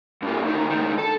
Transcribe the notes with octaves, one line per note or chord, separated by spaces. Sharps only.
G2 A#3
D2 D#3
C#2 D#3
A4